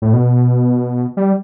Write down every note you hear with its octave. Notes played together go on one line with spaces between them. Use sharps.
A2
B2
G3